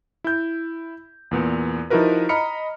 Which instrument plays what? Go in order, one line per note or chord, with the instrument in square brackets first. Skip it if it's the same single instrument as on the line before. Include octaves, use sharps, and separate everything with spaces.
[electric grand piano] E4 G6
E2 A#2 B3
F3 D#4 E4 F#4 A#4 B4
D#5 A#5 B5 F6 C#7